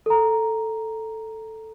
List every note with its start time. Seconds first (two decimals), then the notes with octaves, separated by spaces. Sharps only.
0.06 A4 A#5